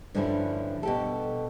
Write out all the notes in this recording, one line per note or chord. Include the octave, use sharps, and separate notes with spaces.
G2 D3 F3 G3 C#4 E4
B2 G4 A4